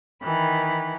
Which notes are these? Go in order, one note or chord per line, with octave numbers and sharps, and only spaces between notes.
D#3 E3 B5